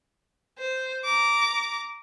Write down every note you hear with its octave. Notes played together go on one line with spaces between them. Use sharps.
C5
A#5 D6